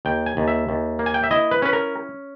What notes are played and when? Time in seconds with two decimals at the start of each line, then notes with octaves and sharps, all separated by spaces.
0.05 D#2 G5
0.26 G#5
0.37 D#2
0.48 E5
0.69 D#2
0.99 A#3
1.06 G#5
1.14 G5
1.24 E5
1.31 E4 D#5
1.51 B4
1.62 C#4 B4
1.73 A#4